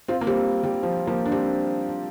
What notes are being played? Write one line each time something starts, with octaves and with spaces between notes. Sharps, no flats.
C4 F4
A#3
G3 C4
G3
F3
F3 A#3
D4
G3 C4